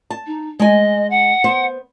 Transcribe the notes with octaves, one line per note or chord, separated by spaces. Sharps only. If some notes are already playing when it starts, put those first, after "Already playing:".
A5
D#4
G#3 D#5 G#5
F#5
B3 C5